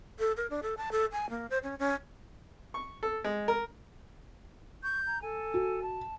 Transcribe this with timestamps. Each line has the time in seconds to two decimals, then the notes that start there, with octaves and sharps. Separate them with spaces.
0.19 A4
0.37 A#4
0.50 D4
0.63 A4
0.77 A5
0.92 A4
1.12 G#5
1.30 A#3
1.50 C5
1.64 C#4
1.79 C#4
2.74 C#6
3.03 A4
3.24 G#3
3.48 A#4
4.83 C#6 G6
5.06 A#5
5.22 A4 G#5
5.54 F#4
5.82 A5